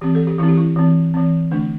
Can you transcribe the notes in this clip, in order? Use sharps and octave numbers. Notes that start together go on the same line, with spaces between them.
E3 C4 G4
A4
G4
E3 C4 E4
G4
E4
E3 C4
E3 C4
D3 A3 D4